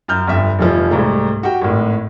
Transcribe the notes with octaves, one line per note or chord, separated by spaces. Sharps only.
F#2 F6 G6
G1 F2 E5
F1 E3 F3
C2 G#2 A3
F#4 G4 G5
G#1 A2